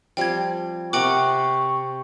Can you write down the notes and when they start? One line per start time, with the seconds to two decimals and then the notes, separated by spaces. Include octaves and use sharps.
0.17 F3 G3 C4 G5 G#6
0.93 C3 A#4 F#5 G5 C#6 D6